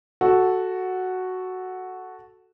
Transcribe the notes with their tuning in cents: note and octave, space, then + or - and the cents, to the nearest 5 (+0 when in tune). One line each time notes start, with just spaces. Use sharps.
F#4 +0 A4 -5